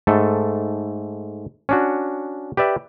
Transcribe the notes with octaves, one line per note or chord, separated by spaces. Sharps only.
G#2 A3 A4
C#4 D4 F#4
G4 B4 D5 E5